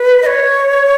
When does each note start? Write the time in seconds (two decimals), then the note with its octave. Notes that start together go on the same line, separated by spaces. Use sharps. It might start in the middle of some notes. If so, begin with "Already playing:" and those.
Already playing: B4
0.22 D#5
0.26 C#5